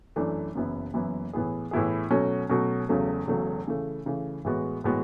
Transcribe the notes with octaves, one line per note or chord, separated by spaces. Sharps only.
F#2 E3 A3 D4
F#1 F#2 E3 B3 E4
F#1 F#2 E3 B3 E4
A2 E3 B3 E4 G#4
A2 E3 B3 E4 G#4
B2 F#3 A3 C#4 F#4
B2 F#3 A3 C#4 F#4
E1 E2 C#3 F#3 A3
E1 E2 C#3 F#3 A3
C#3 E3 A3
C#3 E3 A3
A2 E3 G#3 B3 F#4
A2 E3 G#3 B3 F#4